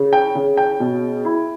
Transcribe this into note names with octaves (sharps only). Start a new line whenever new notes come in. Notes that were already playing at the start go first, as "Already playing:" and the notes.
Already playing: C#3
G5
C#3
G5
B2
E4